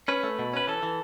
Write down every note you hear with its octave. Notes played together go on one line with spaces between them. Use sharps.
C#4 B4
A3
B2
C#4 B4
E3 A4
E3